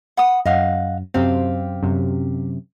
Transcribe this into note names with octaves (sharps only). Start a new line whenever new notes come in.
F#5 B5 D#6
F#2 D#5 F5 F#5
F#2 C3 C4 G4 F5
F#2 C3